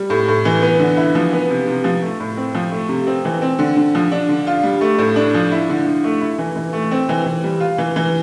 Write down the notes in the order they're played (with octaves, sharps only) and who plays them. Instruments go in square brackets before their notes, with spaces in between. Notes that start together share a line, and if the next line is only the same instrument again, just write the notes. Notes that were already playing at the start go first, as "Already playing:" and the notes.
Already playing: [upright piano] G3
A2
A2
E3
B3
D3
E4
F3
B3
C3
C3
F3
A3
A2
C4
F3
A3
C3
C4
E3
C4
D3
D3
F3
D4
D3
F4
G3
A3
A2
D4
F3
E4
D3
D3
A3
E4
E3
E3
A3
C4
E3
E3
G3
F4
E3
E3